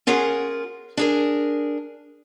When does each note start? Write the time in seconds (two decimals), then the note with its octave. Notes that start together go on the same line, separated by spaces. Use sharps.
0.07 C#4 F4 G#4 A#4 F#5
0.97 D4 G#4 A#4